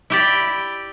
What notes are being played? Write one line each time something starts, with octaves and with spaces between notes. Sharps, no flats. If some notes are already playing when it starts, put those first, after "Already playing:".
E4 G4 D5